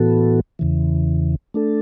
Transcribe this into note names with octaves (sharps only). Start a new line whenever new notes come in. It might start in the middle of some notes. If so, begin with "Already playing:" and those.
Already playing: A2 E3 B3 F#4 A4
E2 C#3 E3
A3 D4 A4